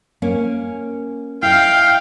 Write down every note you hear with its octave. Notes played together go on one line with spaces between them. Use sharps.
A#3 C#4
E4 D#5 F5 G5